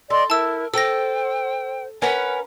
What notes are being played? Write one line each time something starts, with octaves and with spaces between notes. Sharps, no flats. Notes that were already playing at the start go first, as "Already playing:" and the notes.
A4 D5 D#5 C6
E4 A#4 A5 E6
A4 C5 G5 E6 A#6
C#4 A#4 B4 F#5